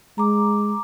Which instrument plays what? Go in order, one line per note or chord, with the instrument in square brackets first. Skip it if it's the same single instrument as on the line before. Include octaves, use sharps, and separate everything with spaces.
[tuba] G#3 [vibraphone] A#5 D6